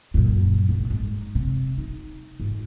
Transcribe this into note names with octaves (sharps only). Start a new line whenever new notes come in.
F#2 A#2
F1 F#2
G#2
C3
D#4
G#2